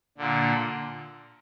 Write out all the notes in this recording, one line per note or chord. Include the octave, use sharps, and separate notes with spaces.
A#2 D3